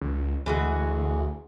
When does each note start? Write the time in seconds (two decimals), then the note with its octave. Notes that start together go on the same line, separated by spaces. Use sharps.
0.01 C#2
0.46 D2 E3 G#3 F#4